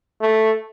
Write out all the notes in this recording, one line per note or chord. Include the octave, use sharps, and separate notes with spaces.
A3